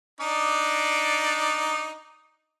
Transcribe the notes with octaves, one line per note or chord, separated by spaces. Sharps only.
D4 D#4 D5